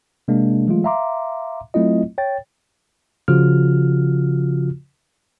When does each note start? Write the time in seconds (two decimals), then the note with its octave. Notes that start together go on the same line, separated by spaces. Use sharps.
0.28 C3 G#3 A#3 D4
0.67 E3 F#3 G#3 A3 F4
0.84 E5 F5 A#5 C6 D6
1.74 F#3 A3 C4 E4 F4 D#5
2.18 C#5 G5 A6
3.28 C#3 F3 F4 F#4 F6